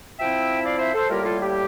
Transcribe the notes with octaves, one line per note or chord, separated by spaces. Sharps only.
F3 C4 E4 E5 G5
D5 F5
C5 E5
A4 C5
A2 G3 A#3 F4 G4 A#4
F4 A4
G4